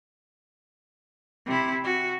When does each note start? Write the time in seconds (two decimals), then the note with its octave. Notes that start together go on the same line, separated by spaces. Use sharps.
1.46 C3 E4
1.84 F#4